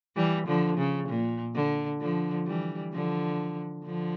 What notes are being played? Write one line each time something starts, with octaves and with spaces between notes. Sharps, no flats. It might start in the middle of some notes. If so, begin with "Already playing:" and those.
E3 G3
D3 F3
C#3
A#2
D3
D3 F3
E3 G3
D3 F3
D3 F3